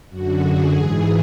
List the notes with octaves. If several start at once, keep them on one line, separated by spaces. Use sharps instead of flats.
F#2 D3 F#4
G#4
G#2 E3